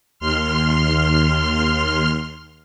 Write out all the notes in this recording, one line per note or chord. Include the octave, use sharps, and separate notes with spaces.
D#2 C6 F6